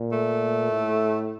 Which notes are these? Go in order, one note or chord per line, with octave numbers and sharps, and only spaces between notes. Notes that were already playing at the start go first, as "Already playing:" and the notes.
Already playing: A#2
A3
A2